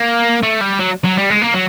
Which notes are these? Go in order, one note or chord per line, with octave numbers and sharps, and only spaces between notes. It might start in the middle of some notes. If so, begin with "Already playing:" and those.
Already playing: A#3
A3
G3
F#3
F#3
G3
G#3
A#3
F#3